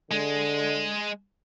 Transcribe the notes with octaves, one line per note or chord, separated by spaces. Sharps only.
D3 G#3